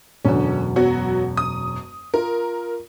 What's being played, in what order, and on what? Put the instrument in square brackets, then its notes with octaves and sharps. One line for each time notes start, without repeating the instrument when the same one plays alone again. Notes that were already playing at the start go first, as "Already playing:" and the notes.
[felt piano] E1 F#2 [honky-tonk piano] D3 C#4
[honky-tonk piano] F#3 B3 F#4
D#6
[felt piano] F4 [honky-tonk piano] A#4